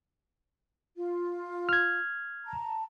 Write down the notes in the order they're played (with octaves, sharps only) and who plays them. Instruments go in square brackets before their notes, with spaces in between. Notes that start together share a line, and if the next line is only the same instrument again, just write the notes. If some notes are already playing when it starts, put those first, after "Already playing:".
[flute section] F4
[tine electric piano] F6 G#6
[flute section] A5 A#5